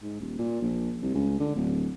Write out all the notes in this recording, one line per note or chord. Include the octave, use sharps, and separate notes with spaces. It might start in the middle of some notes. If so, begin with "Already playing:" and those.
G#2
D#1
A#2
A#1
C2
C#2
D3
D1